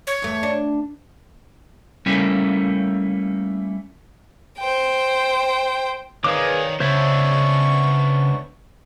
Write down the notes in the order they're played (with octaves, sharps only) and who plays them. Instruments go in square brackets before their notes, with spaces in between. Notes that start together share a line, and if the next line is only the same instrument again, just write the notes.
[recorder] C#5
[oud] E2 A3
D4
[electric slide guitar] G3 A3 A#3 C#4 E4
[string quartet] C5 G5
[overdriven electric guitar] D#3 [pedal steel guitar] G#4 B4 D6 [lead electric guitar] C#5 D5 [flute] F5
[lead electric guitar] C#2 [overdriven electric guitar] B3 D4 [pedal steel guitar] C5 C#5 E5 [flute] C#6